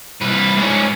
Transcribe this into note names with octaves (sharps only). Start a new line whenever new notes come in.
C2 B4
G#2 C#4